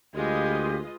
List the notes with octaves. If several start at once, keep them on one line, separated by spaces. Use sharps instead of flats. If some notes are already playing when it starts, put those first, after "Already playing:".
D2 G#3 F4 G4 B4 D#5